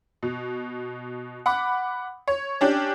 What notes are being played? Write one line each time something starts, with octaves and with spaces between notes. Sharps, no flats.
B2
F#5 B5 D6
C#5
C#4 D4 G4